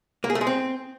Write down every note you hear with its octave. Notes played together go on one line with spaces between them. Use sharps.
A#3
G#4
A3
G#3
C4